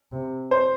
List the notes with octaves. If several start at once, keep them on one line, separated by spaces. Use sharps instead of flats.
C3
C5